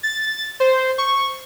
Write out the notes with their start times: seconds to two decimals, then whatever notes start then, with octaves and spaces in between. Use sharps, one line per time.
0.03 A6
0.60 C5
0.98 C#6